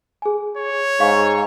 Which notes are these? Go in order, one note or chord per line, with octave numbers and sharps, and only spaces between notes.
G#4 G#5
C#5
G#2 F5 C#6